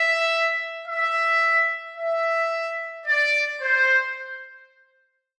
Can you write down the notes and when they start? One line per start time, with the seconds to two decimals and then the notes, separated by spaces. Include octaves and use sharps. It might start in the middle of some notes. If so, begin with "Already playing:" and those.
Already playing: E5
0.87 E5
1.96 E5
3.06 D5
3.61 C5